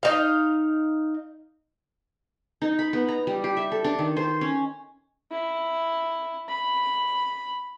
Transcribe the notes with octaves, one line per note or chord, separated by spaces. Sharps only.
D#4 F5
D#4
B5
B3
A#5
G3
G4
E5
A4
D4
D#3
C5
C#4
E4
B5